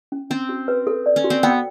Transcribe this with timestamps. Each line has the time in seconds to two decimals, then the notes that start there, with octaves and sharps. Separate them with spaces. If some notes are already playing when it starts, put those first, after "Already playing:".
0.12 C#4
0.31 C4 C#4
0.49 F#4
0.68 B4
0.87 A4
1.06 D5
1.16 C#4
1.24 F#4
1.30 C4
1.43 B3 G5